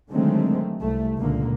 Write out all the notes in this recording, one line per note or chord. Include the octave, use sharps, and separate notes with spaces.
D3 D#3 F#3 G#3 A3 C4
C2 A3
C#2 A#2 D3 A#3